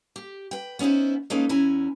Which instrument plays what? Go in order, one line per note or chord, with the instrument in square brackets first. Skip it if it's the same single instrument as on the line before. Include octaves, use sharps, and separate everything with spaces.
[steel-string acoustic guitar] G4
B4 G5
B3 C#4 D#4 E4 C5
G#3 A#3 C#4 D#4 A4 B4
E2 C#4 E4 G#5 A#5